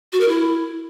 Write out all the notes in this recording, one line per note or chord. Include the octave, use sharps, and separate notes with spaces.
F#4
A#4
E4